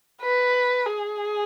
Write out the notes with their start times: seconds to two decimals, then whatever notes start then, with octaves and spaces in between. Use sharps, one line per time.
0.22 B4
0.86 G#4